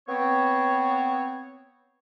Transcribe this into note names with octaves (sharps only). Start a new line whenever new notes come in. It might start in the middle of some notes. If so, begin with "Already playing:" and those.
B3 C4 C#5